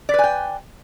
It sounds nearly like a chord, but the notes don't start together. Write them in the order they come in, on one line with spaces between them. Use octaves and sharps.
D5 B4 G#5 G5